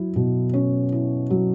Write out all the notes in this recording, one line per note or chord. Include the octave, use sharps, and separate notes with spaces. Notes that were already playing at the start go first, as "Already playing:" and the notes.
Already playing: F#3 E4
B2
C#4
E4
F#3